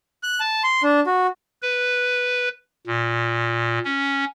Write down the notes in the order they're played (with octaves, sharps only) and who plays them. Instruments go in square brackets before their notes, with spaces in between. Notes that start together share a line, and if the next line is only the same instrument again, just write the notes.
[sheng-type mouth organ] F#6
A5
C6
D4
F#4
[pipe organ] B4
A#2
C#4